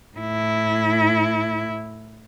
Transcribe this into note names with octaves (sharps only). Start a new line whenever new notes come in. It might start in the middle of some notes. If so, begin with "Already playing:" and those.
A2 E4